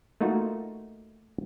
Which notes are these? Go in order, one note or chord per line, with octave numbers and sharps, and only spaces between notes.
A3 A#3 D#4 F4 F#4